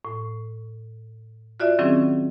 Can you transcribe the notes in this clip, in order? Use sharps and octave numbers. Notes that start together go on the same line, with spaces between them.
A2
F4 F#4 D5 E5
D#3 F#3 C4 C#4 E4 G#4